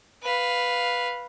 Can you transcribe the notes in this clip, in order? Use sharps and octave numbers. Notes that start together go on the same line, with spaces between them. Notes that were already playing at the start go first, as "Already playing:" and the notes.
B4 F5